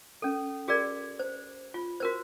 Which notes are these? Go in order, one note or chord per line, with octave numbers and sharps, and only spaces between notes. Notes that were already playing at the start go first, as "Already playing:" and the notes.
C#4 A4
F#4 G#4 A#4 D5
C5
F4
F#4 A#4 C5